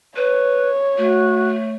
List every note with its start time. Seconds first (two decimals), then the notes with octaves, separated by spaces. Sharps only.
0.16 B4 C#5
0.98 A3 F#4